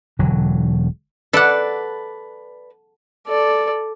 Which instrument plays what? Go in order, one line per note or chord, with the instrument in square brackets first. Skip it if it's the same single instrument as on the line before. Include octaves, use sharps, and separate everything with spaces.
[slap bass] E1 D3 F#3
[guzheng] A4 F#5 [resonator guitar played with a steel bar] B4 D5
[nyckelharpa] A4 D5